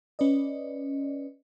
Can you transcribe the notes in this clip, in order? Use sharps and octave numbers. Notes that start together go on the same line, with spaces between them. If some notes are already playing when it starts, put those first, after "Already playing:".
C#4 B4 D5 D#5